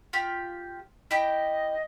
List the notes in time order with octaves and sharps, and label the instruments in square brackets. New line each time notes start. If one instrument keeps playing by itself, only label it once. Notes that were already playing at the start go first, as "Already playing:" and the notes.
[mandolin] F4 G4
[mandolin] E4 G4 [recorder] D#5